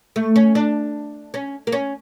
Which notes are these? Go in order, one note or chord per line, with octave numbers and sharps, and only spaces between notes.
A3
C#4
D4
C#4
A#3
C#4